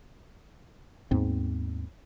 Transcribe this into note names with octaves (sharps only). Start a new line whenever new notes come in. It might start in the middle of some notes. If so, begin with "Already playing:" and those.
D#2 G#2 B3 C4